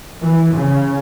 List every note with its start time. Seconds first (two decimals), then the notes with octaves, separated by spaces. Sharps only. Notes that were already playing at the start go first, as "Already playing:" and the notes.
0.22 E3
0.56 C#3